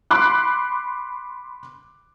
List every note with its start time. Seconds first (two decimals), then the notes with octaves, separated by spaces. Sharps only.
0.11 B5 C6 D6 F#6